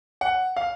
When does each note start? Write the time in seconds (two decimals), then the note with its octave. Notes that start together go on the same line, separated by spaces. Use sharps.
0.21 F#5
0.57 F5